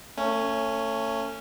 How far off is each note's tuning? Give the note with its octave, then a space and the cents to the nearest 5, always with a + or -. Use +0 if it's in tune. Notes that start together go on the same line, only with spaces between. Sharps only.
A3 +35 C#4 +0